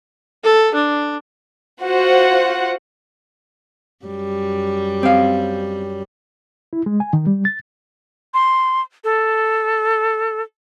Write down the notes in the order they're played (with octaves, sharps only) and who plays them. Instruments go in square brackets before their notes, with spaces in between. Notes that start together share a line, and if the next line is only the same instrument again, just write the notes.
[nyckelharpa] A4
D4
[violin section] F4 F#4 C5 F#5
[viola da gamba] F#2 G3
[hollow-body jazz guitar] C4 F5
[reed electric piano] E4
G#3
G#5
D#3
G3
A6
[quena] C6
A4